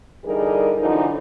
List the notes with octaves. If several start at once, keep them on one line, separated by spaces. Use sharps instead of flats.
D3 E3 G3 D#4 G#4 A#4
F#2 D3 E3 F3 D#4